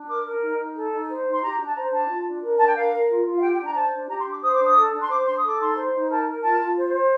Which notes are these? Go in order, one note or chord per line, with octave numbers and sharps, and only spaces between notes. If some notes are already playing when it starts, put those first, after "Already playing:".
Already playing: D4
A#4 D6
A#4
D#4
D#4
A4
D#4
C5
D#4
C6
G4 A#5
D4
A5
C5 A#5
D4 A5
F4
D4
A#4
D4 A5
G5
A#4 F5
A#4
F4
F4
F5
G4 G5
G5
D4
A#5
C5 A5
D4
G4 A#5
C6
D4
D6
C5 D#6
D6
D4
D#6
A4
D4
C6
C5 D6
D4 C6
A4 D#6
D6
D#4 C6
C5
D#4
A#4 A5
A#4
F4 A5
F4
C5
C5